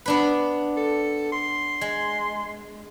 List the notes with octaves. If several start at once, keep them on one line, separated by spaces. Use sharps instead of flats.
B3 D4 B4
A4
C6
G#3